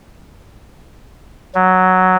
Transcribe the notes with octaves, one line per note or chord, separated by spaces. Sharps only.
F#3